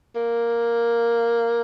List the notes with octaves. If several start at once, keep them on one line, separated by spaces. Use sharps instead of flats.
A#3